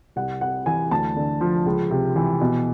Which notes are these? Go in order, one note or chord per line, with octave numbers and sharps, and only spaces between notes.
C2 F#5
C3 F#5
E3 G#5
D2 A5
D3
F3
C#2
C3
E3
B2